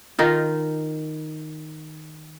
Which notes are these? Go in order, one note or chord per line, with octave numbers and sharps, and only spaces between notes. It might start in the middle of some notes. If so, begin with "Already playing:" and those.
D#3 D#4 F4